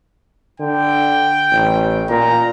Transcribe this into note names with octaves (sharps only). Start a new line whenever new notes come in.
D3 G5
A1
A#2 A#5